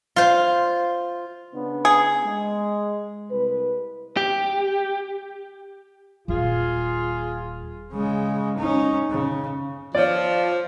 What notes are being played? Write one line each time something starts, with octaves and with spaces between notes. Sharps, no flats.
F4 C5
C#3 B3 D4
G#4
G#3
C2 B4
G4
D#1 F4 G#4
C#3 G#3
C#4 D#4
C#3
F3 C#5 D5